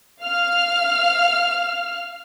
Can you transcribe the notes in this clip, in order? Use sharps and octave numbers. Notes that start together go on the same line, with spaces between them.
F5 F6